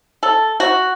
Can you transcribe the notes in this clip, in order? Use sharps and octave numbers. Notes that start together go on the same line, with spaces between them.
A4
F#4